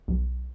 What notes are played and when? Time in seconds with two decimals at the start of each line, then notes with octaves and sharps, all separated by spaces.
0.08 B1